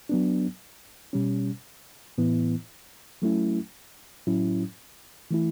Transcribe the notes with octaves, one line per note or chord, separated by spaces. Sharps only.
F#3 B3 D4
B2 G3 C#4
A2 E3 B3 E4
F#3 A3 C#4 E4
A2 F#3 C#4 E4
E3 A3 E4